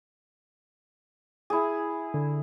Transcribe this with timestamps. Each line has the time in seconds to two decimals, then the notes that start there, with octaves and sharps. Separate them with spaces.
1.50 E4 G#4
2.14 D3